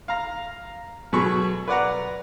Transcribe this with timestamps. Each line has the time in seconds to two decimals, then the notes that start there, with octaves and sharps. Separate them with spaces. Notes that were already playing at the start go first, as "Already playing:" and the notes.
0.08 F5 A#5
1.13 B2 F#3 G#4 A4 B5 C#6
1.68 B4 D5 F#5 A#5